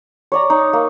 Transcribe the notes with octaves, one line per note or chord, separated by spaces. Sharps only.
C#5 D5 A#5
D#4
A#3